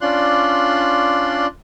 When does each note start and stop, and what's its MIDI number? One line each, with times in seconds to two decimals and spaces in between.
0.01 1.47 61
0.01 1.47 62
0.01 1.47 65
0.01 1.47 74
0.01 1.47 84
0.01 1.47 90